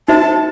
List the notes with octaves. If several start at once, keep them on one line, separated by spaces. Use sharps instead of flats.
D#4 F#4 C5 E5 A5